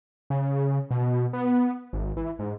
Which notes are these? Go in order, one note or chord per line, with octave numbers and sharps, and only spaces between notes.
C#3
B2
B3
G#1
E3
G#2